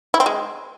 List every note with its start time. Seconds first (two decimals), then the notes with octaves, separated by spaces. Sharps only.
0.14 E4
0.20 C4
0.26 G#3